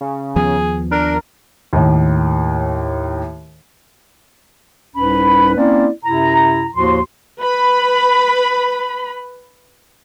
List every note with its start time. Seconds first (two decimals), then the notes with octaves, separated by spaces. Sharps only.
0.01 C#3
0.36 D#2 F3 B3 G#4
0.91 D4 A#4
1.73 D#2 A2
4.95 C2 G#2 C#4 B4 B5
5.56 A#3 C4 C#4 E4 D5
6.03 F#2 C3 E4 A#5
6.75 D#2 A2 F3 F#4 C6
7.40 B4 B5